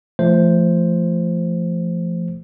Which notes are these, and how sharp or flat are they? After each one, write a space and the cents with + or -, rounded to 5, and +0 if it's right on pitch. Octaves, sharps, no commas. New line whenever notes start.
F3 -30 A3 +0 C5 +0